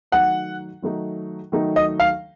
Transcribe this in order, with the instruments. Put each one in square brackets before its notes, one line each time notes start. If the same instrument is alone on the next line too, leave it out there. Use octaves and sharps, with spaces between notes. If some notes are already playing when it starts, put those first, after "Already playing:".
[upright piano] D#3 F#3 A3 D#4 [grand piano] F#5
[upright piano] D#3 F#3 A3 D#4
D#3 F#3 A3 D#4
[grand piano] D#5
F5